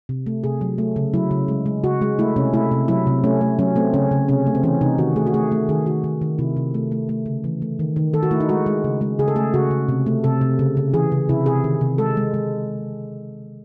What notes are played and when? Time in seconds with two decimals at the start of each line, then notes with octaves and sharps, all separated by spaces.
0.09 C3
0.26 A3
0.44 C3 G#4
0.61 F#3
0.78 A3
0.96 C#3
1.14 F#3 E4
1.31 C#3
1.48 G#3
1.66 G#3
1.84 C#3 F#4
2.01 G#3
2.19 A3 E4
2.36 C3 C#4
2.54 A3 E4
2.72 C3
2.88 F#3 E4
3.07 C3
3.24 A3 C#4
3.41 A3
3.59 F#3 C#4
3.76 A3 C4
3.94 C#3 C#4
4.11 C#3
4.29 C3 C#4
4.47 A3
4.55 C4
4.63 E3 C#4
4.81 C3 D#4
4.98 D#3 F#4
5.16 A3 G#4
5.27 F#4
5.34 A3 G#4
5.52 A3
5.69 D#3 G#4
5.86 D#3 F#4
6.04 D#3
6.22 D#3
6.39 C3 E4
6.57 C3
6.74 A3
6.92 A3
7.09 A3
7.26 C#3
7.44 E3
7.62 A3
7.79 D#3
7.96 D#3
8.14 D#3 A4
8.23 F#4
8.31 A3 E4
8.40 D#4
8.49 G#3 F#4
8.66 G#3
8.84 C#3
9.01 G#3
9.19 C#3 G#4
9.28 A4
9.36 A3 G#4
9.54 C#3 F#4
9.71 C#3
9.88 C3
10.06 A3
10.24 C3 A4
10.41 C3
10.59 C#3
10.77 C#3
10.93 E3 G#4
11.12 C#3
11.29 C3 E4
11.46 C3 G#4
11.64 D#3
11.81 C3
11.98 G#3 A4
12.17 G#3
12.34 G#3